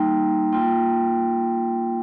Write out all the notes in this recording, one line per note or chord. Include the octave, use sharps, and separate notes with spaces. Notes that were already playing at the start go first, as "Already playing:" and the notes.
Already playing: G3 A#3 D#4 G5 C6
A#3 F4 G5 C6